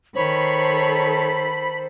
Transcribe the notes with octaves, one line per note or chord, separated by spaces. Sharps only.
D#3 A4 C5 C#5 B5